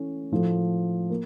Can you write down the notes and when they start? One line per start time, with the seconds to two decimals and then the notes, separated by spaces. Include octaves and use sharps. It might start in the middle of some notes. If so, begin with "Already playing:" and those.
Already playing: E3 A3 C#4
0.31 A2 F3 A3
1.10 A#3